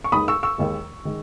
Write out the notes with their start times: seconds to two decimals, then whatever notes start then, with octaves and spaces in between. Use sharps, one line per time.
0.04 C#6
0.12 D#2 D#3 G#3 B5 D#6
0.28 C#6 E6
0.43 C#6 E6
0.58 D#2 D#3 G#3
1.05 D#3 G#3